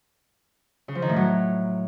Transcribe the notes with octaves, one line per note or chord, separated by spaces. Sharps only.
C#3
F3
D#3
A2
F#3